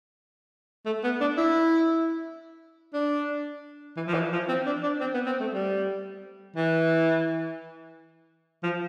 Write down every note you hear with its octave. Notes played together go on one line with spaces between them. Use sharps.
A3
B3
D4
E4
D4
E3
F3
E3
F3
C4
D4
D4
C4
B3
C4
A3
G3
E3
F3